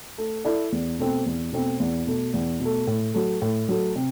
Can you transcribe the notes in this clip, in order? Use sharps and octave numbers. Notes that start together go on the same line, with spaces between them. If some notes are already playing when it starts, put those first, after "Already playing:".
A3
E4 A4 D5
E2
B2 A3 C4
E2
B2 A3 C4
E2
B2 A3
E2
B2
A3
A2
F#3 A3
A2
F#3 A3
C3